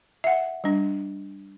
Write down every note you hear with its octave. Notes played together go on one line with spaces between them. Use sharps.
E5 F#5
G3 D4